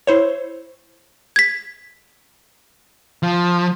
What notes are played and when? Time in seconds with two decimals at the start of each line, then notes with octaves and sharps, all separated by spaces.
0.07 E4 C5 C#5
1.36 G#6 B6
3.23 F3